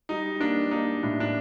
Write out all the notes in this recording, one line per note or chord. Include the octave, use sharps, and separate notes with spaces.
G3 D#4
A#3 D4
A#3 D#4
A2 D4
D4